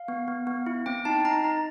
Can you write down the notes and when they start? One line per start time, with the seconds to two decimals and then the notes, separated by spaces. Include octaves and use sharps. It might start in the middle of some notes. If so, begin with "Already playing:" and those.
Already playing: F5
0.08 B3
0.28 B3
0.47 B3
0.66 E4
0.86 C4 G5
1.05 D#4 A5
1.25 D#4 A#5
1.44 D#4